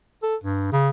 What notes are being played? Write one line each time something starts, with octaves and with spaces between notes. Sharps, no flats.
A4
G2
C#3